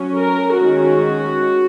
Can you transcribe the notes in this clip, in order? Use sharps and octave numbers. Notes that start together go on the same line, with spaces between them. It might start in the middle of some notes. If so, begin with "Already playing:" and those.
Already playing: F#3 C#4
A#4
D#3 G#3 C#4 F#4